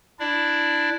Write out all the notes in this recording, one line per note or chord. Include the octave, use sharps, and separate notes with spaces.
D4 E4 D5